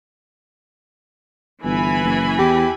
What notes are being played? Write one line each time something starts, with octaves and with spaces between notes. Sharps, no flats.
G1 E3 G#5 B5
F#1
E2 G4